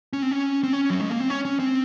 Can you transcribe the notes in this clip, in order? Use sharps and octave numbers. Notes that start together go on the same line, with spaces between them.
C#4
C4
C#4
C4
C#4
F#3
G#3
A#3
C4
C#4
C#4
C4